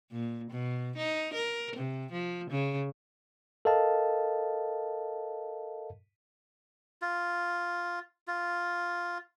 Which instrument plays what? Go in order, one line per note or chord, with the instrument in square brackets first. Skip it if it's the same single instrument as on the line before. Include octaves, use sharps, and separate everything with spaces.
[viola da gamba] A#2
B2
D#4
A#4
C3
F3
C#3
[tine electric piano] A4 A#4 D#5 F5 A5
[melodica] F4
F4